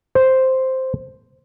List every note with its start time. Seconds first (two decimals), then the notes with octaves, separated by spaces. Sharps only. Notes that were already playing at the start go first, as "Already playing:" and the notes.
0.15 C5